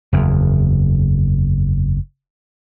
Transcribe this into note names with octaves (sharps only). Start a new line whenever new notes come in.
F#1 E2